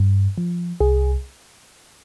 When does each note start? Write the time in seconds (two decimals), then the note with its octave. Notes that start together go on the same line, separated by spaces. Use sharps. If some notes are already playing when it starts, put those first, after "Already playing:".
Already playing: G2
0.38 F3
0.80 C2 G#4